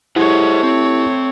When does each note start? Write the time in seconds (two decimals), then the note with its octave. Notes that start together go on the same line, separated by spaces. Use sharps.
0.16 A3 E4 G4 G#4 C5 C#5 F#5
0.63 C4